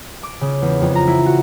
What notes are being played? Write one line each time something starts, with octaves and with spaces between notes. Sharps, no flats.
D6
C#3
E2
F2
A#5
E4
F#4